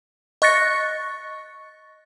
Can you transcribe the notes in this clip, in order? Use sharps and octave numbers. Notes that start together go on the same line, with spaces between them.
D#5 C#6 F#6 A6 A#6 C#7